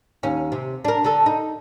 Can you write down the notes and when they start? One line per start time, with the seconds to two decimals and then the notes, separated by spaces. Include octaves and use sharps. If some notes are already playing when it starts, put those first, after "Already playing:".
0.23 D#2 C#4
0.52 C3
0.85 D4 A#4
1.04 D3 A4
1.26 D#4